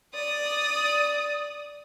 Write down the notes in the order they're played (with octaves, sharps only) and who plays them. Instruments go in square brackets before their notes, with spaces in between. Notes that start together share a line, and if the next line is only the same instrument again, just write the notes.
[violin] D5 D#6